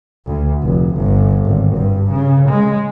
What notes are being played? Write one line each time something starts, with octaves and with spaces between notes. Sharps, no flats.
D2
F1
G1
G#1
G2
C#3
G#3